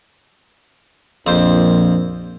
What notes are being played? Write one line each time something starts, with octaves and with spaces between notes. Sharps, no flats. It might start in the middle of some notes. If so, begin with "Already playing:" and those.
A#1 F2 C5